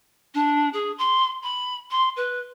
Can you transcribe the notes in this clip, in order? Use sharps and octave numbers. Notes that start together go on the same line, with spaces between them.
D4
G#4
C6
B5
C6
B4